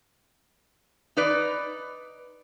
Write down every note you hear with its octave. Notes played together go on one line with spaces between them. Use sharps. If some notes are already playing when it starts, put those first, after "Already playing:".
D#4 B4 D5